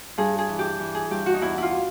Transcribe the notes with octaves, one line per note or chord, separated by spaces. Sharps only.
G2 G#4
G#4
E3
G4
E3
G#4
G2 G4
F#4
D#4
E2 E4
E4 F4